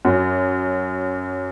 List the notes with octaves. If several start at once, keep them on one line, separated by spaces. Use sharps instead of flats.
F#2